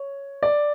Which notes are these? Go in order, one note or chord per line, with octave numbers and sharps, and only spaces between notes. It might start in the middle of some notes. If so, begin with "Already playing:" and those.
Already playing: C#5
D5